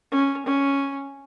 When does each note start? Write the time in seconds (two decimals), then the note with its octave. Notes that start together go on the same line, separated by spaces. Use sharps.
0.11 C#4
0.46 C#4